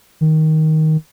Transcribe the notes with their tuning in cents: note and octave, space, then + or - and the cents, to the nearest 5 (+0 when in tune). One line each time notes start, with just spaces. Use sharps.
D#3 +10